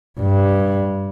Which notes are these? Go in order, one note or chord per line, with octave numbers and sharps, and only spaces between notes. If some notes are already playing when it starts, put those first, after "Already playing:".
G2